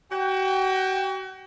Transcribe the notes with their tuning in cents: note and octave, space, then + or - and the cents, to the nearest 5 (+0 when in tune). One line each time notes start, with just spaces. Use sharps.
F#4 +40 G5 +20